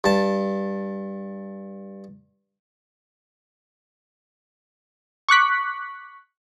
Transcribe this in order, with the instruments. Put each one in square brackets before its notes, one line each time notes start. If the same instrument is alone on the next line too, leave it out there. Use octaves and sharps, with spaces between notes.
[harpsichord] G2 A5
[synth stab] C#6 D6 F#6 B6